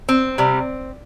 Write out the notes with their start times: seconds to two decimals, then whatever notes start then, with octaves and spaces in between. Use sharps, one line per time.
0.09 C4
0.38 C3 G3